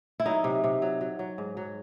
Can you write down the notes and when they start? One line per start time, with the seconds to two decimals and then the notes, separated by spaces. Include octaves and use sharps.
0.20 E4
0.26 F#3 D#4
0.44 C3
0.64 C3
0.82 F#3
1.01 F#3
1.19 F#3
1.38 G#2
1.57 F#3